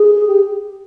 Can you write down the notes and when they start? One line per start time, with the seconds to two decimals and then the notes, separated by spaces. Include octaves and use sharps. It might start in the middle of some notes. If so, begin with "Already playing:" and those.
Already playing: G#4
0.27 G4